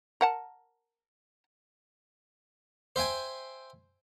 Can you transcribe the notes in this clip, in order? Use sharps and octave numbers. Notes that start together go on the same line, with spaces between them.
A#4 F#5 A5
C5 E5 G5 G#5